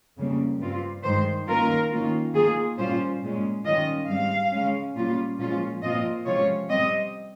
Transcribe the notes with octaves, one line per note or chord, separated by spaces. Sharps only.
F2 C#3 G3 A#3
G2 G3 C4 F4
G2 D#3 G#3 C5
D#3 A#3 C#4 F4 A#4
D#3 A#3 C#4 F4
D#3 A#3 F4 G#4
A#2 G3 C#4 F4 C5
A#2 G#3 C#4
D#3 G3 C#4 F4 D#5
G#2 G3 C4 F5
C#3 G#3 C#4
A#2 G3 C#4 F4
A#2 F3 G#3 C#4 F4
A#2 F3 C4 F4 D#5
C3 F3 G#3 C#4 F4 C#5
C3 G3 C4 D#5